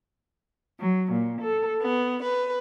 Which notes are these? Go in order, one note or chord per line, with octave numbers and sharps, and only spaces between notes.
F#3
A#2
A4
B3
B4